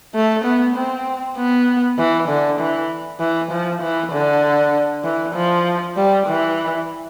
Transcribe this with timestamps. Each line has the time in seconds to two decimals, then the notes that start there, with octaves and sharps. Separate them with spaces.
0.15 A3
0.45 B3
0.76 C4
1.37 B3
1.98 E3
2.29 D3
2.60 E3
3.20 E3
3.51 F3
3.82 E3
4.12 D3
5.04 E3
5.35 F3
5.97 G3
6.27 E3